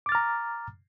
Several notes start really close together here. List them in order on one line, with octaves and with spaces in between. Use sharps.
D6 A6 F6 A#5